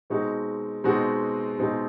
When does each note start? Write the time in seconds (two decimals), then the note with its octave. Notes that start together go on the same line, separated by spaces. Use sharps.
0.10 B2 G#3 C4 D#4 F#4
0.84 B2 G#3 C4 D#4 F#4
1.59 B2 G#3 C4 D#4 F#4